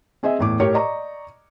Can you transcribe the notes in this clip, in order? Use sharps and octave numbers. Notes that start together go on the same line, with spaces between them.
C4 G#4 D#5 E5 G#5
E2 A2 D6
A2 G4 A#4 C#5 C#7
D5 D#5 A#5 C#6